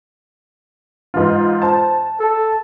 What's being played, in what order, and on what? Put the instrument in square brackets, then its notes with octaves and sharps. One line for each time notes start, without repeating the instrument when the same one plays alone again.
[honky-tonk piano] G#2 E3 F4
[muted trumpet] C5 [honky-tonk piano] A5
[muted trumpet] A4